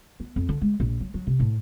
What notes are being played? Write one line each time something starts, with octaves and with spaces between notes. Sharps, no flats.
B3
F2
D3
G#3
A#1
F#3
F#3
C3
A2